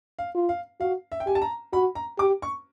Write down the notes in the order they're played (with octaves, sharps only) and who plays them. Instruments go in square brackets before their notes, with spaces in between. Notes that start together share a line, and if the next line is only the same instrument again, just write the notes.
[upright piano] F5
[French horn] F4
[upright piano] F5
[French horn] F#4 [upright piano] F5
[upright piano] E5
G5
[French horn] G4 [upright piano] G#5
[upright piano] A5
A#5
[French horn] F#4 [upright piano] B5
[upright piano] A#5
[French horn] G4 [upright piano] D6
[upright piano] C#6